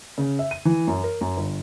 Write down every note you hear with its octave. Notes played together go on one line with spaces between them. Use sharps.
C#3
E5
D#7
E3
F#2
A#4
F#2
G1